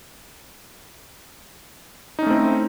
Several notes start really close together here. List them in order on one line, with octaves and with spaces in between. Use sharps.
D#4 C#4 A3 C4 E4